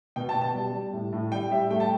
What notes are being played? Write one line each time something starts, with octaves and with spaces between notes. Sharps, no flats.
B2 G5
A5
B2
A5
G3
G3
A2
A2
G3 G5
G3 E5
A3 G5
A5